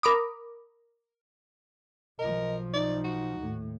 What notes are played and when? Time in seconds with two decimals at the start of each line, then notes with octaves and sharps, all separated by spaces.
0.03 A#4 B5 D6 D#6
2.19 B1 F3 A#4 D#5
2.73 D#4 D5
3.04 F#4
3.37 D#2 A2